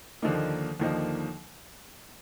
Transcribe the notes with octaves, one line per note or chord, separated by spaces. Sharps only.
D#2 D3 F3 A#3 D#4
D#2 D3 F3 A#3 D#4